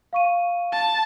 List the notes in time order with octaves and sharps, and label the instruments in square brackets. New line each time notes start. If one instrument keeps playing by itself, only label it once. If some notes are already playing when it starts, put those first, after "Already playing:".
[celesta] F5 C#6 D#7
[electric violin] A5